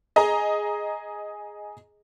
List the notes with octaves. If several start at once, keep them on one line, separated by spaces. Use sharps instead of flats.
G#4 D#5 A#5